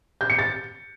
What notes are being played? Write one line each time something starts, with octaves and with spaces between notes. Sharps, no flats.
G6
C#7
A6